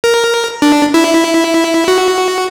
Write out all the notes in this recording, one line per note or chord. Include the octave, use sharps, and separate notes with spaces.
A#4
D4
E4
F#4